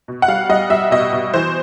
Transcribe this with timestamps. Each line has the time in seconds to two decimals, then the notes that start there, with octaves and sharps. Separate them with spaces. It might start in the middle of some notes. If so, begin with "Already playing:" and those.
0.08 B2
0.22 F#5
0.28 G3 F5
0.49 G3 D#5
0.70 G3 E5
0.91 B2 D#5
1.13 B2
1.34 E3 C5